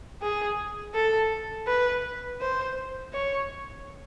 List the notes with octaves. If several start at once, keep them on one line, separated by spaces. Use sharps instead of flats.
G#4
A4
B4
C5
C#5